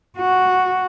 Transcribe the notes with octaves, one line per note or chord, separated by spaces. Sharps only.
F#4